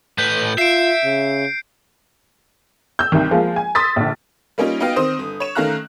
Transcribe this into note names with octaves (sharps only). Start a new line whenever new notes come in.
A2 B4 G6
F4 E5 C7 D7
C#3
E6 G6
C2 D#3
F3 G#3 A#3 F4
G#5
C6 D#6 E6 A6 B6
A#1 D3
G3 A#3 C#4 D#4 F4
B3 D#4 F#4 D#5 F5 G5
D#3 C4 C5 D#6
G1
C#5 E7
D#3 A3 C#4 F5 A#5 F#6